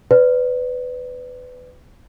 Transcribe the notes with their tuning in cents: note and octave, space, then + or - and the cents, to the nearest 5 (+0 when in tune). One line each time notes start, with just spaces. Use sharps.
B4 +25 D5 -10